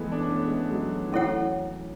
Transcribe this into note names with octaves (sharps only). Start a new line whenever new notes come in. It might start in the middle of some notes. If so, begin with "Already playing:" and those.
Already playing: E3 G#3 A3 B3
D4
C#4
B3
G#3
A3
G#3
F#3
E3
F#3 C#4 E4 A4 C#5 F#5